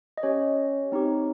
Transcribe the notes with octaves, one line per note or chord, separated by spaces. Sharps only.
D#5
C#4 G4 C#5
C4 D#4 G4